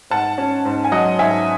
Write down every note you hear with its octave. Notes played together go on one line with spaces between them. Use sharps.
G#2 F#5 A5
C#4
G#2
G#5
F#3 D#5 F#5
G#2 E5 G#5